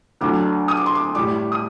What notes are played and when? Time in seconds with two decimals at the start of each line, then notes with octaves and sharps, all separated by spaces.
0.21 D2 D3 F#3 D6
0.68 D#6
0.77 D6
0.86 C6
0.95 D6
1.15 A2 G3 D6
1.52 D#6